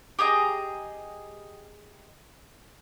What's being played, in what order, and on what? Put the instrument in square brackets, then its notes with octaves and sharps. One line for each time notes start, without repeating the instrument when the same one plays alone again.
[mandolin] G4 G#4 D#5 A#5